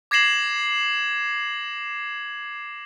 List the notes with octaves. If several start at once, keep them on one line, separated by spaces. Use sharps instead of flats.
D6 G#6 A#6 C7 E7 F#7